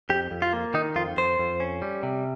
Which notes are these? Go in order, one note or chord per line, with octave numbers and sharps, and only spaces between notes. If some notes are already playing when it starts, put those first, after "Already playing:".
F2 G4
F2
F4
A#3
D#3 D#4
F2 F4
F2 C5
F2
C#4
G3
C3